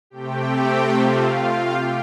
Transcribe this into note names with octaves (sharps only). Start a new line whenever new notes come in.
C3 A3 C4 G4 G5
F4 F5
G4 G5